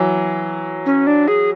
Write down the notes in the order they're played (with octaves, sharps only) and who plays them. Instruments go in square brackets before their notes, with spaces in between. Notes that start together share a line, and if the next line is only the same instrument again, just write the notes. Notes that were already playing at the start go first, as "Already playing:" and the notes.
Already playing: [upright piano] E3 F#3
[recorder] C#4
D4
G#4